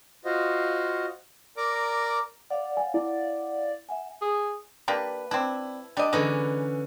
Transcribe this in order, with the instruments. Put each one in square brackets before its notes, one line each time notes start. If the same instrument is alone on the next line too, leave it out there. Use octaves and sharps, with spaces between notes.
[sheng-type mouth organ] F4 F#4 C5 D#5
A#4 D5 A#5 D6
[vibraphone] C#5 F5 F#5 [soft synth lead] D5
[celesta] G#5
[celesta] E4 [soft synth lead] D5
[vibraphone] E5 F#5 G#5
[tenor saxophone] G#4
[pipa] A#3 D4 G4 [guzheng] B4
[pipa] C4 D4 [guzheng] E4
[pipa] G3 D#5 [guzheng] D4
[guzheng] D3 E3 C#4 [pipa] G#3 D#4 B4